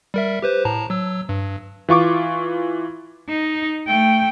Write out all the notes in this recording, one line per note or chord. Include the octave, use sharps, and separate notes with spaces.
G3 A#4 E5
G4 B4 C5
A2 A5 A#5
F#3 E6
G2
E3 F4 C#6 D6
D#4
A3 G5